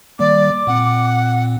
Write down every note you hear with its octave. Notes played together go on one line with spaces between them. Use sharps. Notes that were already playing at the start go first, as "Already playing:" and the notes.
D#3 G3 A#3 D5 D6
A#2 C4 F#5